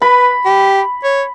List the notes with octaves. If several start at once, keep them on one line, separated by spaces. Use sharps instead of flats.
B4 B5
G4
C#5